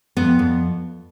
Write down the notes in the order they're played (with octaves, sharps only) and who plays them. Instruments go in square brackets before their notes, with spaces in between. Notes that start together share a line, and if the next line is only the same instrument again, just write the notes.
[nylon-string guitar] F2 B3
F2